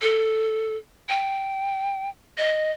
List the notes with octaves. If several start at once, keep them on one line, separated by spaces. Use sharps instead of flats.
A4
G5
D#5